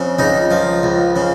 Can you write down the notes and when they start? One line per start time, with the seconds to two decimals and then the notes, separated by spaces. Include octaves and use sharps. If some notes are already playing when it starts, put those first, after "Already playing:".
Already playing: F2 C#3
0.19 C#2 D#4
0.51 F3
0.83 C#2
1.16 C#3